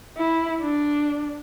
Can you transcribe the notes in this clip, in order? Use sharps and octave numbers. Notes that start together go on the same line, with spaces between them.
E4
D4